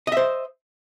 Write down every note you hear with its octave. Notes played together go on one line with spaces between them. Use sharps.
C5 D#5 E5